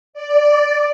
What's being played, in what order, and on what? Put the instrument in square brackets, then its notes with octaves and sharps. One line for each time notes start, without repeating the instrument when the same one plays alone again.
[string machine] D5